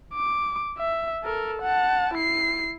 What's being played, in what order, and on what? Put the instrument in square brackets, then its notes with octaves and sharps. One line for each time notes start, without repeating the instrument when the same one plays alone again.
[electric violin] D6
E5
A4 A#4
F#5 A5
E4 C7